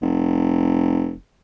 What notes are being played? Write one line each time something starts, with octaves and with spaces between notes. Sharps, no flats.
F1